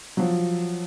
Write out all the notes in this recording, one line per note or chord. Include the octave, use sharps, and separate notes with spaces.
F3 F#3